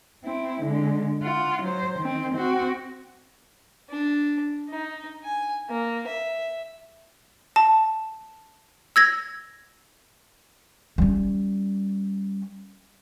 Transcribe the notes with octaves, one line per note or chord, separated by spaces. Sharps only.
C4 E4
D3 G#3
F4 F#5
F#3 C5
D#3 C4
C4 F#4
D4
D#4
G#5
A#3
E5
A5
E6 G#6 A#6
G3 C#4